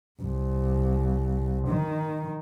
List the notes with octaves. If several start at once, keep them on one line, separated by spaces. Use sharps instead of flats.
C2
D#3